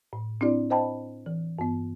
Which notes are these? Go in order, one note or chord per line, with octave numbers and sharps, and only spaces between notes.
A2
C4 D4 E4 G4 D5
C5 D#5 G5 A5 B5
E3
G2 B3